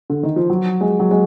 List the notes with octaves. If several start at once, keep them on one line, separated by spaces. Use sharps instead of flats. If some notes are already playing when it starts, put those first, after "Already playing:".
D3
D#3
F3
F#3
G#3
F#3
G#3